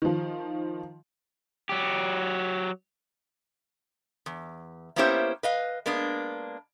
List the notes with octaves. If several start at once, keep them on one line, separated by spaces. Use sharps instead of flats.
D#3 F3
F#3 G4
E2
A#3 B3 C#4 E4 G4 C5
B4 D#5 F5
G#3 A#3 B3 D4